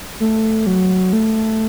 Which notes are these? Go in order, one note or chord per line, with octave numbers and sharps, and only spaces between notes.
A3
F#3
A3